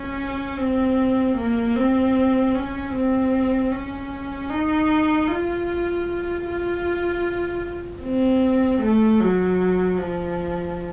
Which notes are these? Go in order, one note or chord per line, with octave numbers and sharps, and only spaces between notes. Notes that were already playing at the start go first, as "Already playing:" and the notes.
Already playing: C#4
C4
A#3
C4
C#4
C4
C#4
D#4
F4
F4
C4
A3
F#3
F3